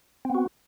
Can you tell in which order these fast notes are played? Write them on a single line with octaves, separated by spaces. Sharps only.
C4 B3 F#4